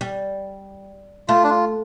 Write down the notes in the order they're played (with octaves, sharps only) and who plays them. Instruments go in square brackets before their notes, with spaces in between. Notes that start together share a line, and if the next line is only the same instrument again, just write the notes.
[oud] G3
[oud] A3 [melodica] F4
[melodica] D4
F4